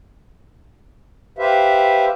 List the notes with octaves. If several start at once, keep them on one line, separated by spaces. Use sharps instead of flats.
G4 B4 C5 E5 F5